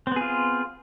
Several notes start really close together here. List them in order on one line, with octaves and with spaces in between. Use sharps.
C4 B3 G#4 F4